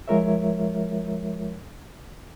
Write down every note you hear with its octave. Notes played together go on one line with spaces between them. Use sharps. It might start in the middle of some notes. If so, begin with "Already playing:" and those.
F3 G#3 F4 A#4 C#5 E5